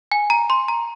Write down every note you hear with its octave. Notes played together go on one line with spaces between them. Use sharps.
G#5
A#5
C6
A#5